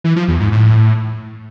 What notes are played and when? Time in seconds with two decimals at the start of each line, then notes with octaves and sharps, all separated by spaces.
0.04 E3
0.16 F3
0.28 E2
0.40 G#2
0.52 A2